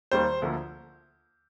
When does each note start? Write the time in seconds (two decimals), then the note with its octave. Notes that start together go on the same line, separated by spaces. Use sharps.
0.11 D#2 D#3 G3 A#3 C5
0.42 D2 D3 F3 A#3